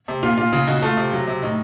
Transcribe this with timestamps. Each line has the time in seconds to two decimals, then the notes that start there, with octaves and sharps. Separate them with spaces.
0.08 C3
0.23 A#2 F4
0.38 A#2 F4
0.53 C#3 F4
0.67 C#3 D#4 F#4
0.82 A3 F4
0.97 C3
1.13 F#3
1.27 C3
1.42 A2 D#4